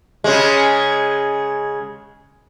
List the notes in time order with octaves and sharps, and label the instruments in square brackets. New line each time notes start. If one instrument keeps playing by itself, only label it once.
[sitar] C#3 G#3